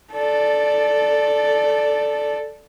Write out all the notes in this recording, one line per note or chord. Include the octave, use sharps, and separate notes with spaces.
A4 D5